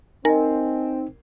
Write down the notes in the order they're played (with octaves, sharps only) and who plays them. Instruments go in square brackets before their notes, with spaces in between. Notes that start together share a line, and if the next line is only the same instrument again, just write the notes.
[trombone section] C4 [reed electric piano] D#4 [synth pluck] A#4 [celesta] D#5 G#5